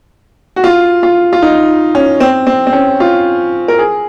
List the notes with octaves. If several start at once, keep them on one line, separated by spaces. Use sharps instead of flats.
F#4
F4
F4
F4
D#4
C#4
C4
C4
C4
C#4
F4
A#4
G#4